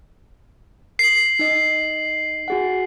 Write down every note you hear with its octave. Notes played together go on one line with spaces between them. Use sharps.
C7 F#7
D#4 D#5
F#4 G#4 F#5